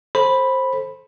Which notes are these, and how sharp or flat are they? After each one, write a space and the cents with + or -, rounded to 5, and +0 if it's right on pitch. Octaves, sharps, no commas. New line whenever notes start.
A4 -15 C5 +15 B5 +0